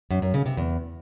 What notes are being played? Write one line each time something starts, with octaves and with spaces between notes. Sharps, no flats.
F#2
F#2
C#3
C3
E2